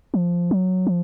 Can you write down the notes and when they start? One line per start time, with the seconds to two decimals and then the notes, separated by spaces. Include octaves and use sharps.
0.14 F3
0.51 F#3
0.87 F3